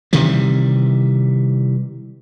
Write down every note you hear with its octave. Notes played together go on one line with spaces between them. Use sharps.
C3 D#3 E3 G3